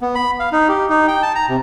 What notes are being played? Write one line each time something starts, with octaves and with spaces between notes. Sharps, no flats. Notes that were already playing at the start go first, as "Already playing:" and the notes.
B3
B5
F5
D#4
G4
D#4
G5
A5
A#5
C3